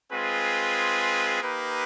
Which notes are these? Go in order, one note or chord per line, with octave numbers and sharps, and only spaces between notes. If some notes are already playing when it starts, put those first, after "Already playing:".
G#3 C4 F4 G#4 B4
A#3 D#4 G4 B4